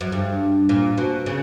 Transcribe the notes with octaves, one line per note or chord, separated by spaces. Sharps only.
F#2
G2
A#2
B2
C#3